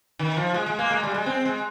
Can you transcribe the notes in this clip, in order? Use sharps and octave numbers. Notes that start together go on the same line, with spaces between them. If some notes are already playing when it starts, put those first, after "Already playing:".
D#3
F3
G#3
G#3
A#3
G#3
G3
G#3
C4
G#3